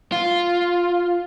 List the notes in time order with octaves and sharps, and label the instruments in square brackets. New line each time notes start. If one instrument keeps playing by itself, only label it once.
[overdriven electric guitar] F4